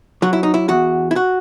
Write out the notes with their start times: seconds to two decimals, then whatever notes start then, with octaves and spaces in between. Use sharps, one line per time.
0.22 F#3 F#4
0.33 E4
0.43 D#4
0.54 E4
0.69 E2 F#4
1.11 E4
1.16 F#4